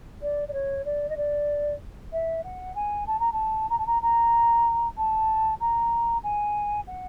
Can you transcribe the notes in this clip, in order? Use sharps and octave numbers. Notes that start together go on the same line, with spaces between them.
D5
D5
C#5
D5
D#5
D5
E5
F#5
G#5
A5
A#5
A5
A#5
A5
A#5
A#5
A5
A#5
G#5
F#5